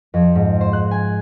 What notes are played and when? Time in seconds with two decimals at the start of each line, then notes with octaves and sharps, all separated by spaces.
0.14 F2
0.36 G#2
0.61 C5
0.73 F#6
0.91 G#5